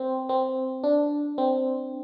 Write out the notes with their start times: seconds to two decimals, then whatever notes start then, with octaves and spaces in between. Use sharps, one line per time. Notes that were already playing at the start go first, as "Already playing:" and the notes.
Already playing: C4
0.29 C4
0.84 D4
1.38 C4